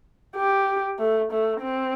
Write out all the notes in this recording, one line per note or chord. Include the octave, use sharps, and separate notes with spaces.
G4
A3
A3
C4